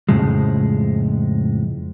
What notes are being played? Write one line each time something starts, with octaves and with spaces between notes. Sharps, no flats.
F2 A2 C#3 F3 G#3